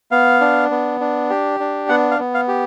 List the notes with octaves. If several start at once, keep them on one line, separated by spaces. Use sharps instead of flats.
B3 F5
D4
B3
D4
G4
D4
B3 F#5
F5
B3
F5
G4